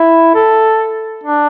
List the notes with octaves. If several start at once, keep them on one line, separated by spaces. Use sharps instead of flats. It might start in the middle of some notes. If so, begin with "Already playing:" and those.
Already playing: E4
A4
D4